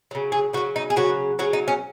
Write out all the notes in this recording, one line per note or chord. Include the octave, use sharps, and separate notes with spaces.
C#3 F#3
G#4
C#3 F#3 F#4
D#4
G#4
C#3 F#3 F#4
C#3 F#3 F#4
D#4
C#4